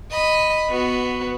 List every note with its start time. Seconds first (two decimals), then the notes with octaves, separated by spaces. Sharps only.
0.11 D#5 B5
0.70 B3 F#4